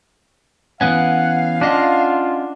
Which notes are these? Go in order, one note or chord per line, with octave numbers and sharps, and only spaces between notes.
E3 B3 C#4 F5 F#5
C#4 D4 F4 D#5 F#5